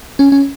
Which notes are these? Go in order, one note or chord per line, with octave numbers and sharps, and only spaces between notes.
C#4
C#4